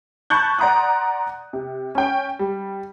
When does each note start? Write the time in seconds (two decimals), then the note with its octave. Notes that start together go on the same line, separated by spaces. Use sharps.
0.30 A5 B5 C#6 F#6 G6
0.58 D5 F#5 A#5 C6 D#6 F#6
1.53 C3
1.95 C#4 G5
2.39 G3